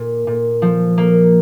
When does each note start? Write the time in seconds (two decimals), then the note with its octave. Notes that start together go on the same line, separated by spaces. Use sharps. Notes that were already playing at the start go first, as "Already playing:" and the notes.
Already playing: A#2
0.27 A#2
0.62 F3
0.98 A#3